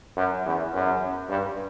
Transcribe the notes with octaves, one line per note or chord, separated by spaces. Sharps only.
F#2
E2
F#2
G2